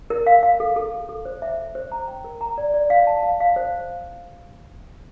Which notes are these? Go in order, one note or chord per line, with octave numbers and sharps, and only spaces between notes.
A#4
F5
F5
A4
A4
A4
A4
C5
E5
E5
C5
A#5
G5
A#4
A#5
D5
D5
F5
A5
F5
F5
C5